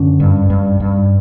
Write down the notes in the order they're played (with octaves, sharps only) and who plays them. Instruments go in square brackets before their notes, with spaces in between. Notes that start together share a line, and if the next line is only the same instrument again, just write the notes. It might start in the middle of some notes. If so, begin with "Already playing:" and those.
Already playing: [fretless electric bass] F#2 D3 C#4
G2
G2
G2